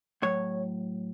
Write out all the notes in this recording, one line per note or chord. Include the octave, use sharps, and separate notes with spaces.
A2 F#3 C#5